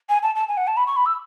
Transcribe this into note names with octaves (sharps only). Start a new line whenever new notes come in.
G#5
A5
A5
G#5
F#5
A5
B5
C#6
B5
E6